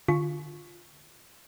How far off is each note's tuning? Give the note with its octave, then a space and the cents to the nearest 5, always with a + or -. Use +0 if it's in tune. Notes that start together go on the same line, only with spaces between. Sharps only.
D3 +25 F4 +0 C#6 +0